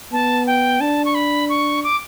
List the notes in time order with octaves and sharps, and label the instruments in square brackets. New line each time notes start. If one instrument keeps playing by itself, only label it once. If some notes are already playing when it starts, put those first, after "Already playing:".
[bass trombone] B3 [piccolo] A5
[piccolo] G5
[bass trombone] D4 [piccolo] A5
[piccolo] C#6
B5
C#6
D6